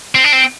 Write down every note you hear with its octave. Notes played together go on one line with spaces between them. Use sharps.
C4
D4
C4